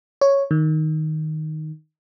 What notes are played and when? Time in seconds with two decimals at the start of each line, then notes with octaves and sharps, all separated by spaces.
0.21 C#5
0.51 D#3